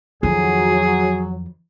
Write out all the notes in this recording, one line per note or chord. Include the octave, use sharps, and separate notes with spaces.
F2 D#3 F#3 G#4